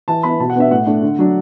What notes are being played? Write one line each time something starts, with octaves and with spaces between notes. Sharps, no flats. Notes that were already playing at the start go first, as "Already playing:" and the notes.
E3 A5
B3 E4 B5
B2 A5
F#5
B3 D4 E5
A2 F#5
A3 D4
D3
F#3 D4